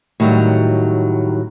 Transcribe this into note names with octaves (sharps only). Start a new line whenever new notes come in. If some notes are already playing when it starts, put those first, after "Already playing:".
A2 D#3 F#3 G3